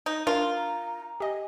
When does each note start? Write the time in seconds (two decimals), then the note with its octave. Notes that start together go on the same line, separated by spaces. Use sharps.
0.06 D#4
0.27 D4 F4 A#4 C6
0.57 A#5
1.20 G4 D#5 G#5